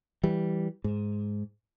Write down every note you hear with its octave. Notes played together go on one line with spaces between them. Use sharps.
E3 G3
G#2